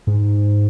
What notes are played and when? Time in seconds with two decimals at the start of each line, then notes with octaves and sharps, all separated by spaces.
0.07 G#2